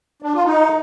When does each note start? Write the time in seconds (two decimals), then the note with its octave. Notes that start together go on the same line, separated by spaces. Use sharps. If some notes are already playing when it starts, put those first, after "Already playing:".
0.22 D4
0.34 F4
0.45 D#4